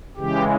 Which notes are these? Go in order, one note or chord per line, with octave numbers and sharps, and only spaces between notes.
C#3 E3 G#3 G4